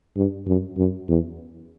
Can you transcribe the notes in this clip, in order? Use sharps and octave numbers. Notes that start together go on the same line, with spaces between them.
G2
F#2
F#2
E2